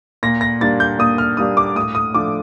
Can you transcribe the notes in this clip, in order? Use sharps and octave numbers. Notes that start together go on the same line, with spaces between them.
A#2 A#6
A#6
G3 A#3 D4 A6
G6
A#2 D#6
F6
G3 A#3 D4 D#6
D6
A2 D#6
D#6
F3 A3 D4 D6